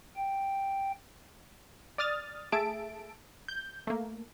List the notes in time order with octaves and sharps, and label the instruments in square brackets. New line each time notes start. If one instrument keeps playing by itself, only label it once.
[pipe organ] G5
[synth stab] D5 D#6 F6 A6
A3 G#4 E5 A5 D7
G6
A3 A#3